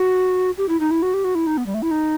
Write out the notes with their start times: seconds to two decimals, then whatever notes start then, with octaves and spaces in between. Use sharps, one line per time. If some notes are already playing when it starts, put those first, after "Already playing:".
Already playing: F#4
0.58 G4
0.69 E4
0.80 D#4
0.91 E4
1.02 F#4
1.14 G4
1.24 F#4
1.35 E4
1.47 D#4
1.57 B3
1.66 G3
1.74 A3
1.82 E4
1.91 D#4